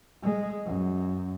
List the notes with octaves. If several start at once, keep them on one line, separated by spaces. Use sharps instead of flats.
G#3
F#2